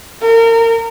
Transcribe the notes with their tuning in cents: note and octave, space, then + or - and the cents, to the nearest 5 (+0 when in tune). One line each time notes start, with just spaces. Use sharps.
A#4 -30